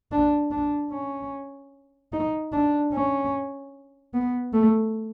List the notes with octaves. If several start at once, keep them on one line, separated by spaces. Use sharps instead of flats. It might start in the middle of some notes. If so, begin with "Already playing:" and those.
D4
D4
C#4
D#4
D4
C#4
B3
A3